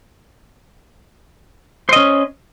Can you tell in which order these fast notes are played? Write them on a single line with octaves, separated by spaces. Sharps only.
C5 D#5 C#4